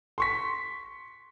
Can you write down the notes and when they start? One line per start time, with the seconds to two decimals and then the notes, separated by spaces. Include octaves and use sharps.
0.18 C6 C#6 B6